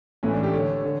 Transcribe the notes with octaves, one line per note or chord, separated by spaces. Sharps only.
A2 E3 A3 C#4
D4
G4
D3 A3 C#5
D3